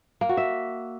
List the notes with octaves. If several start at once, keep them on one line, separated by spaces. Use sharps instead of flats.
A#3
F#4
E5